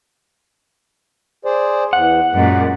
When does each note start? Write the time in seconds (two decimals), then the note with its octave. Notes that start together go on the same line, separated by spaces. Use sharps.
1.45 G#4 C5 D5
1.93 E2 F#5
2.34 F#2 A#2 G#3